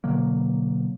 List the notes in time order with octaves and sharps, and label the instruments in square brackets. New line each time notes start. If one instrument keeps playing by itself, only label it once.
[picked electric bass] B2 D3 F#3 A#3